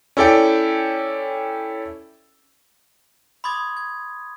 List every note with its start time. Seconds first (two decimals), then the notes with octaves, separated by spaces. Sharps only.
0.17 C#4 E4 A4 D5 G5
3.44 B5 C6 D6 D#6 G#6 A6
3.77 G#6